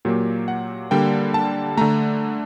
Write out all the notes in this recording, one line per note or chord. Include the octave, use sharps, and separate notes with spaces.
A#2 F#3 A#3 G4
F#5
D3 G3 A#3 G5
A5
D3 A3 A#5